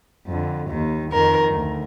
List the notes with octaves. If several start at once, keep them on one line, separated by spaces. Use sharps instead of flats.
F2 D3
D#2 D#3
F2 D#3 A#4
D2